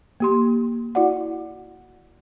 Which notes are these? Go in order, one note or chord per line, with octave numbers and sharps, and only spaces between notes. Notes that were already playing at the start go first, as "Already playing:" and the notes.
A#3 G4 C6
E4 F#4 D5 F#5